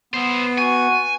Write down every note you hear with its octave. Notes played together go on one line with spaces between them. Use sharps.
B3 E4 C5
F#4 G#5